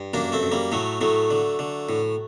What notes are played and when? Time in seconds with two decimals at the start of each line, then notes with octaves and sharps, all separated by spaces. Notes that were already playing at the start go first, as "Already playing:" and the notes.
Already playing: G2
0.14 F#2 A#3 D4
0.32 A3 C4
0.43 F#2
0.52 G3 A#3
0.72 A2 F#3 A3
1.01 A2 F#3 A3
1.30 D3
1.59 D3
1.89 A2